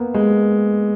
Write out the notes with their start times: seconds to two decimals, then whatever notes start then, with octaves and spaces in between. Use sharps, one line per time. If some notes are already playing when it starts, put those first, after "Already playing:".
Already playing: A#3 B3
0.14 G#3